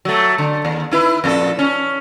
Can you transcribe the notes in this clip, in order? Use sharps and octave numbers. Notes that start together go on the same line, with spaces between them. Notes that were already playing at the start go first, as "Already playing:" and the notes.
F#3 A3
D3
D#2
D#4 E4 B4
F2 A#2 A4
C#4